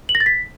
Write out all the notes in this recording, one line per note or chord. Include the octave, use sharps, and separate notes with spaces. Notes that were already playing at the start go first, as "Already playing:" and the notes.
F#7
A#6
A6
B6